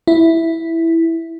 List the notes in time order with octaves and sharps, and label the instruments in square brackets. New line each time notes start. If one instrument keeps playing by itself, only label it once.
[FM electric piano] E4